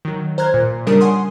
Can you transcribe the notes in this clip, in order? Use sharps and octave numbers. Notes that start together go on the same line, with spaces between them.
D#3 F#3
C5 A#5 F6 F#6 G#6
A#2
C#3 G3 D4 A#4 D#6
F#5 G#5 C6 D#6